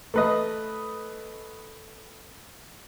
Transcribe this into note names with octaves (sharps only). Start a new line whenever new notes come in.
A3 B4 D#5